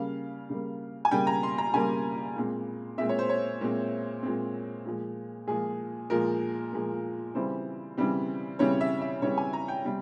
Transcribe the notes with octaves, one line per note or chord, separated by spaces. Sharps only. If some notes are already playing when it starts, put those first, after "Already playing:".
Already playing: C#3 G3 A#3 F5
C#3 G3 A#3
G#5
C#3 G3 A#3 G5
A#5
C6
A#5
C#3 G3 A#3 G#5
A#2 G#3 C4
A#2 G#3 C4 E5
C#5
C5
C#5
A#2 G#3 C4
A#2 G#3 C4
A#2 F3 G#3
A#2 F3 G#3 G#4
A#2 F3 G#3 A#4
A#2 F3 G#3
C#3 E3 G3 C4 C5
C#3 E3 G3 C4
C#3 E3 G3 C4 C#5
E5
E5
C#3 E3 G3 C4 C#5
G#5
A#5
G5
C3 G3 C4